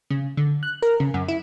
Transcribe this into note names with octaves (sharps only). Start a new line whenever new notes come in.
C#3
D3
F#6
A#4
C#3
F#2
E4